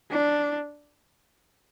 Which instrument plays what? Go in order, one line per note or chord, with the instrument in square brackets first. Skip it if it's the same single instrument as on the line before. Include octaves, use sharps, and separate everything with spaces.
[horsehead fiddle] D4